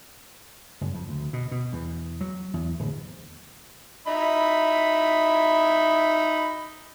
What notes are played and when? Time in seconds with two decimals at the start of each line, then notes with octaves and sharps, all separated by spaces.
0.81 F#1
0.95 F2
1.09 D2
1.33 B2
1.51 B2
1.73 E2
2.21 F#3
2.54 E2
2.79 D1
4.07 D#4 E5 B5